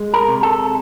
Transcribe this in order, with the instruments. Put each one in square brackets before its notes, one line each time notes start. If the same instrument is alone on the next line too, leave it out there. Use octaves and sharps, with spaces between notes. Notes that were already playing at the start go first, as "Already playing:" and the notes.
Already playing: [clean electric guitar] G#3
A#4
C3
A4